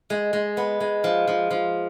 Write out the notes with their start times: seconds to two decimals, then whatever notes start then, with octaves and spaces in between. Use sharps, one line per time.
0.10 G#3
0.33 G#3
0.57 B3
0.80 G#3
1.04 F3
1.27 F3
1.51 F3